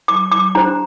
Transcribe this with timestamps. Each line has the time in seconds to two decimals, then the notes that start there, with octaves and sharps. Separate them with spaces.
0.08 D6
0.31 D6
0.55 D4 G4 C5 A#5